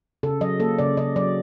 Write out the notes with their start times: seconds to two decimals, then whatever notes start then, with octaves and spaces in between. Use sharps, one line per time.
0.23 C#3 A4
0.41 F#3 D#5
0.60 A#3 A4
0.79 C#3 D5
0.97 C#3 D#5
1.16 F#3 D5